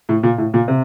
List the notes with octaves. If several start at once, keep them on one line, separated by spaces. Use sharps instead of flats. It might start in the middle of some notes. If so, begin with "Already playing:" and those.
A2
A#2
A2
A#2
C3